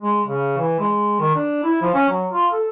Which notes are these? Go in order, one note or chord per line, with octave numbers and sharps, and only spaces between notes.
G#3
C#3
E3
G#3
D#3
D4
E4
F3
C#4
F#3
F4
A4